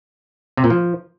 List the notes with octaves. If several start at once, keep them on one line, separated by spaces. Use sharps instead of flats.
C3
A#2
F3